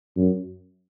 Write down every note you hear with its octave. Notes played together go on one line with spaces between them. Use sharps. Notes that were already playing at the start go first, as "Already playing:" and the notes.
F#2